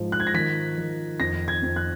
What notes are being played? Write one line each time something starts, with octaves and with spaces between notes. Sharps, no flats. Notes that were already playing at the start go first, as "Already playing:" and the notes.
Already playing: G#2 F3
F#6
G#6
A#6
D#3 B6
D#3
F2 A#6
G#6
F2
F#6